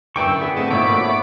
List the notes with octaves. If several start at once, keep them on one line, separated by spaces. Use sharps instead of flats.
F#2 D3 E4 B4 E5 G5 C#6 D6
B3 G#4
A2 A3 C4 D#5 E5 A5
G#1 A#2 C5 D5 E5 B5 C#6 D6
F#4 A4 C#5